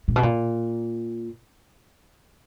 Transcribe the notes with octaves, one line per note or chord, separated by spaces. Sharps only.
A#2
B2
A#2